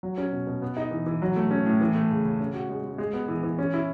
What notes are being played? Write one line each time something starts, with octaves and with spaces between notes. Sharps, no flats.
F#3
C#4
B2
B2
B3
D#4
E3
E3
F#3
A3
C#4
A2
E3
A3
C#3
C#3
C#4
F#4
G#3
G#3
G#3
B3
E3
E3
C#4
E4